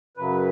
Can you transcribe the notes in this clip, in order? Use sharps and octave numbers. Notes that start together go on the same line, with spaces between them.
F#2 C#3 F#3 B4